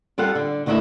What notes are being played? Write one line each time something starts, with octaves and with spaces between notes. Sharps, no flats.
G3 F4 A4 F5 F#5
D3
D3 D#3 A3 D4 E4 F#4